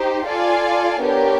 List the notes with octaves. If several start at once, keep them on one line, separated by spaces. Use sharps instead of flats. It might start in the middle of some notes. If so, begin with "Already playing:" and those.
Already playing: D#4 G4 C5
F4 A4 D5 F5 G#5
B3 D4 G4 A#4 C#5